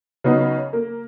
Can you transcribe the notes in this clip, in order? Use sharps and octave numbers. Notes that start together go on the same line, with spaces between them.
C#3 F#3 B3 D#4
A#3